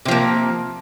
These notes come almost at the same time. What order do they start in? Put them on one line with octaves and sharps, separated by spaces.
C3 F3 A#3